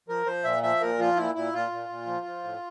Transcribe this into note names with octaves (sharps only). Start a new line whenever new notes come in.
F3 A#4
F3 C5
A#2 E5
F3 E5
A#2 A#4
F3 F4
A#2 E4
A#2 E4
A#2 F4
A#2
A#2
F3
F3
A2